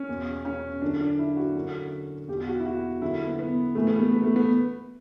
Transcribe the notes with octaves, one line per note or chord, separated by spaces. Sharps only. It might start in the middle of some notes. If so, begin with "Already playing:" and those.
Already playing: C#4
E2 B2
C#4
F#2 D3 D4
D4
E4
F#4
F#2 D3
E2 B2 G4
F#4
E4
F#4
F#2 D3 E4
B3
B3
A2 E3 A3
B3
A3
B3
A3
B3